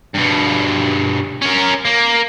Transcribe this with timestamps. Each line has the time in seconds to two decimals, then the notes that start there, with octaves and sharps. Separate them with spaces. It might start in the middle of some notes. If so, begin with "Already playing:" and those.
0.15 G2 B2
1.42 C#4 A#4
1.85 A#3